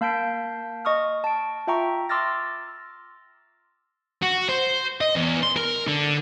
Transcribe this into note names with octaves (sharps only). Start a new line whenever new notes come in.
A#3 F5 A5 G6 B6 D7
D#5 C#6 D#6 F6
A5 D7
F4 E5 G5 A#5 C#6
C6 D6 E6 F6 A6 A#6
F#4
C5
D#5
E2
C6
A#4
D3